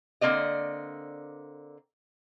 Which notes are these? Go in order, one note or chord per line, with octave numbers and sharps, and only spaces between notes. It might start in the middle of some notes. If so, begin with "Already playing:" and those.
D3 A#3 C4 D5 D#5